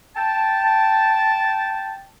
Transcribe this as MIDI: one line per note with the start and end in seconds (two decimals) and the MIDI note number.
0.16 2.06 79
0.16 2.06 81